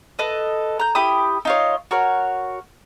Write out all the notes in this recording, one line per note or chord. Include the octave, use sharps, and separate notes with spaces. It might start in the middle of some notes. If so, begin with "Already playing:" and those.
A4 B4 D#5
A#5 G6
E4 G4 B5 D#6
D#4 F4 C#5
F#4 A#4 C#5